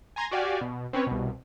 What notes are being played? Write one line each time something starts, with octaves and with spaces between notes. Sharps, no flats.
G#5 A#5 C6 G#6 A#6
F#4 G4 D5 F5 G#5
B2
C4 C#4 B4 C#5
C2 B2